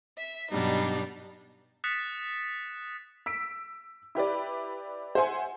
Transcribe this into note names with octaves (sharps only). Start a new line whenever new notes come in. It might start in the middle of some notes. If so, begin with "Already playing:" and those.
E5
G2 B2 F#3 G3 D4 D#4
D#6 F#6 A6 B6 C#7 E7
E6 B6 D7
E4 G4 B4 D5
C5 E5 F#5 G#5 C6